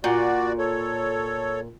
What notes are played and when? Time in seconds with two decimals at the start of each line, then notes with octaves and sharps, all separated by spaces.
0.04 A#2 F#4 D5
0.58 A4 C#5